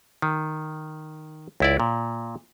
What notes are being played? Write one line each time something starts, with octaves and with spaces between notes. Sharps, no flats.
D#3
C#2 E4 D5
A#2